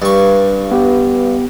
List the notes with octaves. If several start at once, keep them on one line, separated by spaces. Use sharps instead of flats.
G2 C#6
B3 G4